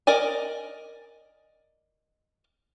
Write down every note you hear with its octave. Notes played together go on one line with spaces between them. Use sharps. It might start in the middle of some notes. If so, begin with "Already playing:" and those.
A#4 D5 D#5 G#5